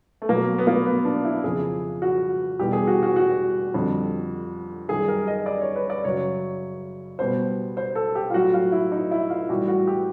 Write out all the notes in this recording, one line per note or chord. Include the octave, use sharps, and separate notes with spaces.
A3
B2 F#3 A#3
B3
A#3
B3
D4
E4
F2 C#3 F3 G#4
F#4
E2 B2 G3 G4
G#4
F#4
F#4
F#4
F2 D3 G3
F#2 D#3 G3 G#4
A#4
D#5
D5
C#5
B4
D5
F#2 C#3 F#3 C#5
B2 G3 C5
C5
A4
G4
F4
A2 F#3 F#4
F4
E4
D#4
E4
F4
A2 E3 G3 F#4
F#4
G4